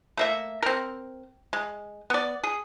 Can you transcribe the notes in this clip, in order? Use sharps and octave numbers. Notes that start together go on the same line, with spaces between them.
A3 A#3 E5
C4 A#4
G#3
B3 D5
G#4